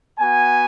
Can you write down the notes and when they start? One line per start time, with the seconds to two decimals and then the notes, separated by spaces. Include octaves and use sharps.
0.19 B3 F#4 G#5